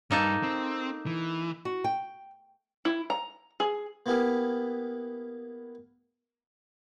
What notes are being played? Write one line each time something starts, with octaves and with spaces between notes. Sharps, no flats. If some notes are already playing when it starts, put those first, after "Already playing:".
G2 A#3 D#4 A4
C4
E3
F#4
G5
E4
A#5
G#4
A#3 B3 E4 G4 G#4 F5